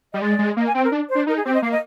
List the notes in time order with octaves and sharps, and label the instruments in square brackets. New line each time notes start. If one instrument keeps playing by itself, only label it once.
[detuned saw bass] G3 [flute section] D#5
[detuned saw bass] G#3 [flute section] D5
[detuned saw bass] G#3
[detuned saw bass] A#3 [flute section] D#5
[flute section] G#5
[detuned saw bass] C4 [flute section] G5
[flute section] A#4
[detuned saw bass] D4
[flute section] C5
[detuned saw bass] D4
[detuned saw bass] D#4 [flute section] A#4
[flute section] G#4
[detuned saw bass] C4 [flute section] G4
[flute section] D#5
[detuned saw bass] A#3 [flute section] F5
[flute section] D#5